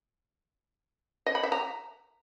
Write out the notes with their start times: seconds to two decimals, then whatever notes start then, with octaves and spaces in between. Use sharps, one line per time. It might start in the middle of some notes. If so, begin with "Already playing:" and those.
1.26 D#5
1.35 B5
1.43 E5
1.52 A#5